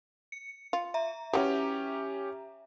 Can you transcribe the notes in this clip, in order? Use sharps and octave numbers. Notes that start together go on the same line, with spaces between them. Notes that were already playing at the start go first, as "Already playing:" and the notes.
C#7
F4
E5 A#5
E3 F#3 C#4 G4